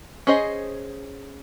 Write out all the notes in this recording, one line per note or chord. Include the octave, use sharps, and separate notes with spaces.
C#4 G#4 C5 D#5